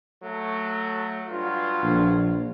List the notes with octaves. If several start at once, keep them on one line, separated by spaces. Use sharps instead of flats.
F#3 A3
G2 F#3 F4
A#1